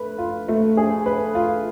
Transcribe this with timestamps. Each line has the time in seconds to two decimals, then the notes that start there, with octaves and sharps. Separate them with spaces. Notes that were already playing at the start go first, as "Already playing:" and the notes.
Already playing: A3 B4
0.18 F4
0.49 A3
0.77 G#4
1.06 B4
1.35 F4